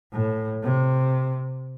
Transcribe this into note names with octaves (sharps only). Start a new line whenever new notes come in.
A2
C3